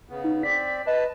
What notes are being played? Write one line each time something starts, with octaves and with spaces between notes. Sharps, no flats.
C#3 B3
D#4
C4 D5 B6
B4 D#5 A5